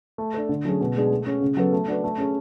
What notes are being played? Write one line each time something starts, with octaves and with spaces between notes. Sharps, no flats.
A3
D4 A4
D3
F#3 A3 C#4 G#4
B2
G#3 D4 G#4
A3
C#4 G#4
C#3
F#3 B3 F#4 A4
A3
D4 F#4 B4
A3
C#4 G#4